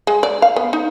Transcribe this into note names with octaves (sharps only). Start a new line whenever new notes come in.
G#3
D5
F5
B3
D#4